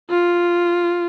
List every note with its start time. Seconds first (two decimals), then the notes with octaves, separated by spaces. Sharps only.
0.10 F4